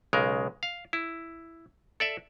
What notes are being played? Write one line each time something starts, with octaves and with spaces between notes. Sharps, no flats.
B1 C#3 G#3 A#4
F5
E4
A4 D5 E5